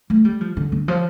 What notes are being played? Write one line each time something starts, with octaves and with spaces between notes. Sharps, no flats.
A3
G3
F3
D3
D3
F3